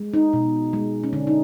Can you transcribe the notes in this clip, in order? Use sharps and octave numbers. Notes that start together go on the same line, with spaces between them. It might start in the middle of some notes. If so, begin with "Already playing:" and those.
Already playing: G#3
D#4
B2
G#3
C#4
D3 D4
D#4